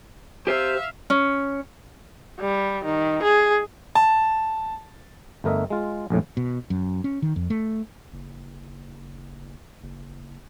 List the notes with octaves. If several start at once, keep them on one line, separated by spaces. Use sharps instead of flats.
G4 C5 E5 F5
C#4
G3
D#3
G#4
A5
G1 A3 A#4 D#5 E5
G#3 F4
A#1 F2 A2
B2
F#2
C#4
D#3
F2
A3
F#1
F#1